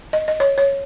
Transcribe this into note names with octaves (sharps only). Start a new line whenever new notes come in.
D#5
D#5
C#5
C#5